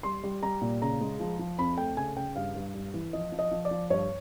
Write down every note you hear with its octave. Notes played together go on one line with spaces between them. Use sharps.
G3 C6
G3
G3 A#5
A#2
C#3 A#5
G#3
F3
F3
F2 B5
A3 G5
C#3 G#5
C#3 G5
G2 F5
G2
G2
E3
F3 D#5
F3
D#5
F3
D5
F3
G2 C#5